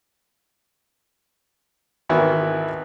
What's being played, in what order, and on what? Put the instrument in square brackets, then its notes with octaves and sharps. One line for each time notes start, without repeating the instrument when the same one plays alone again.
[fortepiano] G#1 D#3 E3 B3 E4 F#4